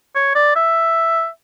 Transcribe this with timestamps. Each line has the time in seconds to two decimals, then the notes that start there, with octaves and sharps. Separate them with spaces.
0.15 C#5
0.35 D5
0.56 E5